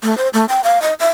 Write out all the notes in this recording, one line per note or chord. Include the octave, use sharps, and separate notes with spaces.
A3
C5
A3
G5
F5
D#5
E5